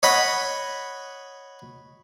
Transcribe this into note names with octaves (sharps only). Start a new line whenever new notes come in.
C#5 D#5 F#5 B5